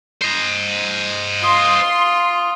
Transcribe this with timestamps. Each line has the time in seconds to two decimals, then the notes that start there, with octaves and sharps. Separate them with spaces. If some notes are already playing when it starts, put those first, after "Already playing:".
0.22 C5 D#5
1.43 F4 C6 D#6